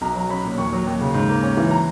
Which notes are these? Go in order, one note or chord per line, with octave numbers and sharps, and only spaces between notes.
B1 A#5
F#3 A#5
C#4 B5
A#2
D#2 C#6
F#3
D#2
C#3
G#2
A#3
C#4
E3
A#5